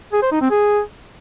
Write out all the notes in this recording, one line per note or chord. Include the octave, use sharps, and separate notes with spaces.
G#4
C5
D#4
C4
G#4